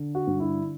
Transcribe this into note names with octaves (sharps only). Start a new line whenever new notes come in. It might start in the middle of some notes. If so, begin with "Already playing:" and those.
Already playing: D3
F#4
G2
E4